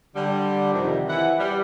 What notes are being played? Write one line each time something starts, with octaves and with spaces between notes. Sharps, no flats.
D3 G3
F2 C3 D#3
E3 E4 F#5
G3